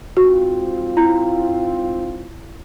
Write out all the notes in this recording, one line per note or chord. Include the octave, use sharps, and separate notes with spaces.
G#2 C4 F4 F#4
E4